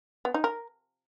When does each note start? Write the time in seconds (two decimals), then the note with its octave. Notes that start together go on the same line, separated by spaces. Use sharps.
0.25 B3
0.34 D#4
0.44 A#4